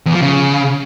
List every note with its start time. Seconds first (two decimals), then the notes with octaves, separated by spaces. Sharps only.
0.06 E2
0.13 F3
0.21 C#3